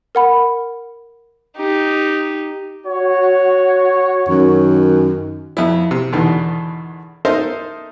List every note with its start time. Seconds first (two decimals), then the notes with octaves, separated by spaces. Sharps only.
0.15 A#4 F#5 B5
1.57 D#4 G4
2.87 F#4 C#5
4.29 F#2 D#3
5.57 F2 E4
5.91 C3
6.12 E2 B2 D3 D#3
7.25 D#4 A4 A#4 C5 D#5 E5